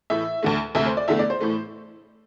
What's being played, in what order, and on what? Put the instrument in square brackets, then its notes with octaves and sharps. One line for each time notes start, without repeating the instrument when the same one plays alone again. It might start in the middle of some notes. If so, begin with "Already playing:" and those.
[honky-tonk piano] A2 E3 A3 E5
D2 D3 A3
D2 C3 A3 E5
C5
D5
E2 D3 A3 E5
D5
C5
A2 E3 A3